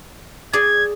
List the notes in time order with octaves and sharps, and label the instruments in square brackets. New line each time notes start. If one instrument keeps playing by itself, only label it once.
[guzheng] G#4 D5 [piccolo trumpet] G#6